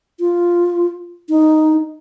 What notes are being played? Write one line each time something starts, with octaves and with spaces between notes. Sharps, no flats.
F4
D#4